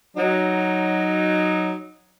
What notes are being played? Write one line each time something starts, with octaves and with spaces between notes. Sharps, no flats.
F#3 D#4